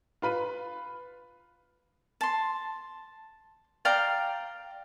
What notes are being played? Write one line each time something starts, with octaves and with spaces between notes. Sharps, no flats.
F4 B4 B5 D#7
A5 C6
D5 F5 G5 A#5